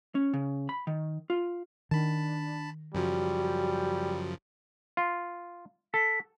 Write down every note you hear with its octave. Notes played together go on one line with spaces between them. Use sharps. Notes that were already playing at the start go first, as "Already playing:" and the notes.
C#4
C#3
B5
D#3
F4
D#3 D4 A5 B5
F#2 C#3 F3 G3 F#4
F4
A4 B6